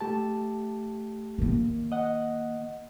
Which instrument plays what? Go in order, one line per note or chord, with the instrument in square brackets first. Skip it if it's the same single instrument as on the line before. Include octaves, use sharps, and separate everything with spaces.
[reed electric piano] A3 G4 A5
[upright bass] D#3 A#3
[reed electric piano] D#5 F#5